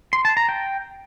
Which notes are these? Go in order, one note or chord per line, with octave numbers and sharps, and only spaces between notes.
C6
A5
A#5
G5